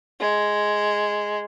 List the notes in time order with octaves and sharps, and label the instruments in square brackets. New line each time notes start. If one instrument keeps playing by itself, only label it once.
[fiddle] G#3